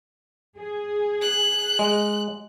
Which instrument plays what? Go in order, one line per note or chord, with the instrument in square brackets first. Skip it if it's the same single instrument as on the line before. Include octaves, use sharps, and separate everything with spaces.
[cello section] G#4
[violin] F#6
[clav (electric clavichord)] G#3